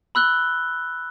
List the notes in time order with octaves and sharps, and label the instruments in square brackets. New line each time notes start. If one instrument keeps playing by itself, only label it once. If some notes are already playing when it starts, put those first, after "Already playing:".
[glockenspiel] B5 E6 F#6 G7